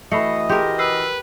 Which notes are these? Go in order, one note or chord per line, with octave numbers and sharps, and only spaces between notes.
E3 A3 F#4 D#5 B5 C7 C#7
G4 G#4 A#4 C6
B4 E6 F6 C7